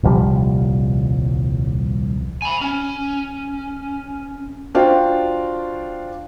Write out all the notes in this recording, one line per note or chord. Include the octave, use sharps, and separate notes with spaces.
D#1 C2 F3 G3
G#5 B5
C#4
D4 F4 F#4 C5 F5 G5